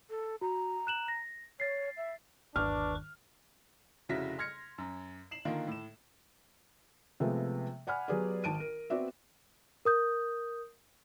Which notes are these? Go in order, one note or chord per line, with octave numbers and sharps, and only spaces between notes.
A4
F#4 A#5
F#6 E7 F#7
A#6
C#5 A6 C7
E5
G1 D#2 D4 B4 C#6 D6 F6
F1 C#3 E4 F#4 A#6 B6
C6 F6 G#6 A#6 C#7
F#2
C7 E7 F#7
D3 D#3 A#3 F4
A2 E7
C3 F3 G#3 A3 B3
D5 F#5 G#5 B5 F6
F#3 B3 G4 G#4 B4 D5
G#1 A5 D7 D#7
A#4
B3 C4 F#4 D5 E5
A#4 D#6 G6